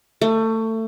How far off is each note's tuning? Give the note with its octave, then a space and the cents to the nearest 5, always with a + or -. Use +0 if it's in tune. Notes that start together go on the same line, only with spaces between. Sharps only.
A3 +25